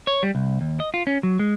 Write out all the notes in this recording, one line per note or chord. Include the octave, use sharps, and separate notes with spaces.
C#5
G3
C2
D#2
D#5
F4
C#4
F#3
G#3